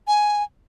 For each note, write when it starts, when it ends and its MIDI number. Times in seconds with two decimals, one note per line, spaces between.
0.08 0.43 80